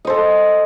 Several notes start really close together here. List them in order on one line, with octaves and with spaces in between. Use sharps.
D#5 C5 A4